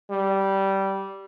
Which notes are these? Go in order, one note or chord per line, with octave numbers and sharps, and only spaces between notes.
G3